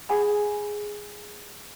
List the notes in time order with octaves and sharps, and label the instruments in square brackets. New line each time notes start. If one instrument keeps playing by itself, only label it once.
[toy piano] G#4 F#5 G#5 B5